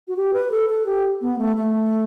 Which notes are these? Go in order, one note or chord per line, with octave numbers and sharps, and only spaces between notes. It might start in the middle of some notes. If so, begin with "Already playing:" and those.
F#4
G4
B4
A4
A4
G4
B3
A3
A3